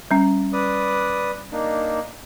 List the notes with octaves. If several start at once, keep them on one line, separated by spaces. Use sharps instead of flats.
G3 C#4
B4 D5 D#6
A#3 D4 D#4